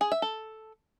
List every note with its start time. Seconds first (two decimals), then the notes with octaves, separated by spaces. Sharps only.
0.01 G#4
0.12 E5
0.22 A4